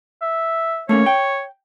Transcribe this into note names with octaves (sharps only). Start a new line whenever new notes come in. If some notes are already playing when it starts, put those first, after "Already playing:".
E5
A3 A#3 C#4 C#5
G5